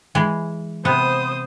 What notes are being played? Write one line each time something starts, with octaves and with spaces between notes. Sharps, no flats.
E3 G#3 G#4
C3 B3 C5 F#5 D#6